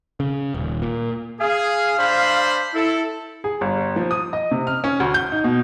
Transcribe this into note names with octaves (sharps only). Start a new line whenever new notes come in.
C#3
D#1
A#2
G#4 F5
D4 C5 B5
E4 A4
G#4
G1
F3
D#6
D#5
C3
F6
C#4
D2
G6
D#4
B2